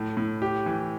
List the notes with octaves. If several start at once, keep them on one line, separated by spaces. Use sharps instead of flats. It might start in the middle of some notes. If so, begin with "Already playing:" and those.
Already playing: A2
A2
G4
E3